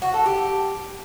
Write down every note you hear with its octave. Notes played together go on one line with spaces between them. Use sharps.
F#4
A4
G4